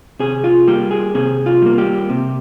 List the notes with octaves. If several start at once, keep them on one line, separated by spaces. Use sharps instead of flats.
C3 G#4
F4
G3 A#3 G4
G#4
C3 G#4
F4
G3 A#3
G4
C3